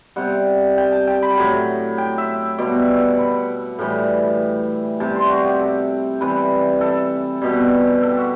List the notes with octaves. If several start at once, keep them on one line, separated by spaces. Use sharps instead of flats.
C3 G3 F#5
G5
A5
G5
B5
A2 F#3
G5
E5
B2 G3 D5
E5
F#5
B5
A2 E3 G3
C3 G3 A5
C5
F#4
G4
A4
C3 E3 G3 B4
A4
B2 G3
A4
G4
F#4